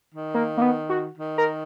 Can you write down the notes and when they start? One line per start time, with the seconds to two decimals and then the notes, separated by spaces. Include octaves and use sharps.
0.14 D#3
0.35 A#3
0.58 A#3
0.62 B3
0.90 F#4
1.17 D#3
1.38 A#4